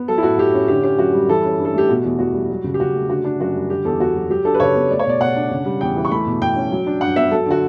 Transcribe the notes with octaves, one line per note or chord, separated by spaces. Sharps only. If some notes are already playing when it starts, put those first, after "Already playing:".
Already playing: B3
F#3 A4
E4
A2 F#4
A2 G4
C#4
D3 G4
C#4 G4
F#2 F#4
G3
E3 A4
C#4
G2
A4
A3 G4
B2 F#4
E2
E2 F#4
G3
F#3
C#3
G4
C#3 F#4
A3
D3 F#4
D4
F#2 F#4
G3
D3 G4
E2 A4
E2 F#4
F#3
F#3 G4
D4 A4
B4
C#3 C#5
B3
A3 D5
C#5
B2 D5
B2 F#5
D4
C#3
G3
E2 G5
E3
C#6
A3 B5
B2
B2 G5
C#4
F#3
D4
G2 F#5
B3 E5
F#3 A4
D3 F#4